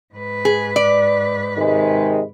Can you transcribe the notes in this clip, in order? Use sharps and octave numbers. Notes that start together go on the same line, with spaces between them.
G#2 B4
G#4
D5
C3 D#3 G#3